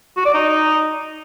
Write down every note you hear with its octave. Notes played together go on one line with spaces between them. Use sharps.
F#4
D5
D#4